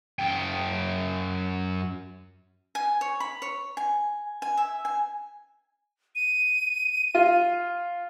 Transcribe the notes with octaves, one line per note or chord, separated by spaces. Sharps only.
F#2 G5
G#5
C#5
B5
C#5
G#5
G#5
E5
G#5
D#7
F4